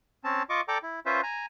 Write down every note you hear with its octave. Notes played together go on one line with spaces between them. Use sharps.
C4 C#4 A5
F4 D#5 C#6 D6
A4 D5 G5 A#5 D6
E4
C#4 F4 B4 C5 E5
G#5 A#5